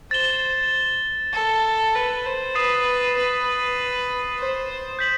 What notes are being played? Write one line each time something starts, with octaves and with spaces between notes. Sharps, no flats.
C5 A6 E7 G7
A4
B4
C5
B4 D#6 A6 C7 E7
B4
C5
G6 B6 F#7